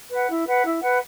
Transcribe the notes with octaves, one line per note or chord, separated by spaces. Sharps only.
B4 F#5
E4
B4 F#5
E4
B4 F#5